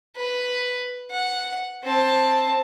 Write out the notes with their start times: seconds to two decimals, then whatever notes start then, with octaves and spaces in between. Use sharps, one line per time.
0.16 B4
1.11 F#5
1.83 C4 A5